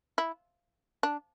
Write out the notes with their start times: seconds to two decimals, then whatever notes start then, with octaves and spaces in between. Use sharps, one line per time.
0.18 E4
1.03 D4